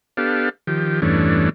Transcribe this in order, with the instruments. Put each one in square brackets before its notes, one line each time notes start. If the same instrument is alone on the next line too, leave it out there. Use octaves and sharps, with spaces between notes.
[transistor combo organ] B3 D4 G4 A4 F5
D#3 F3 G4
E2 G2 E3 A3 C#4 D4